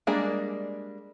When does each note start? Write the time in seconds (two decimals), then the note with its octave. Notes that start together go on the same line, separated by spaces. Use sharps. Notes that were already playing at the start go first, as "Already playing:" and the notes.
0.07 G3 G#3 A#3 D4 G#4